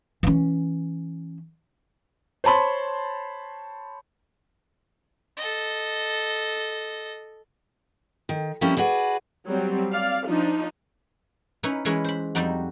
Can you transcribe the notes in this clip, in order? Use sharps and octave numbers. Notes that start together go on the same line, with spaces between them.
E3 C#4
C5 C#5 A5 B5 C6
A4 D#5
D#3
F3 G3 A#3 C4 C#4 E4
F#4 G#4 B4 D5
F#3 G3 C4
D5 F5
F3 D4 D#4
C#4 D#4 E4 B4
E3 G#3 C#4 E4 G#4 B4
C5 B5
F2 G3 D#4 F#4